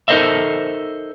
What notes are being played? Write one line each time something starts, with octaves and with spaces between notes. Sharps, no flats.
D#4 A4 A#4 C5 D#5 E5